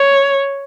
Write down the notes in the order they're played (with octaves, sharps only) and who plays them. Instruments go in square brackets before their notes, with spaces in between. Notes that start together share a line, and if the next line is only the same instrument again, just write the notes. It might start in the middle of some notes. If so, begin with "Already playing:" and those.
Already playing: [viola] C#5